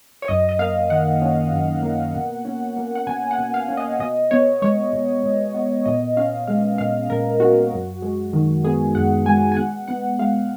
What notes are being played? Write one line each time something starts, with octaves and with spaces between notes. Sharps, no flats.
C#5
F#2 D#5
D#5
A#3 F5
D#3 F#5
C#4
F#2
A#3
B2
C#4
A#3
F#5
B2 G#5
F#5
B2
F5
C#4
D#5
B2 D#5
B3 C#5
G#3 C#5
B2
B2
B3
A#2 D#5
C#4 F5
G#3 F5
A#2 F5
A#2 A#4
C#4 F#4
F#2
G#3
D#3
B3 G#4
F#2 F#5
G#3 G#5
G#5
B2 F#5
B3 F#5
G#3 F5